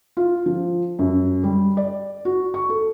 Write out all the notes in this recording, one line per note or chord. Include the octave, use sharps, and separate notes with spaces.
F4
F3
F#2
G3
D5
F#4
C#6
A4